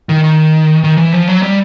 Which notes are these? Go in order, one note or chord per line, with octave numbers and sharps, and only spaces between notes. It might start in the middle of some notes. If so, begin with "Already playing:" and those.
D#3
D#3
D#3
E3
F3
F#3
G3